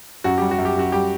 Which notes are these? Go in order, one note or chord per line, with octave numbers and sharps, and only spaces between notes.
F#2 F#4
G3 G4
F#4
F#2
G4
F#2 F#4
G3 G4